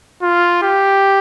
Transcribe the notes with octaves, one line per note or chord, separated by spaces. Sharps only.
F4
G4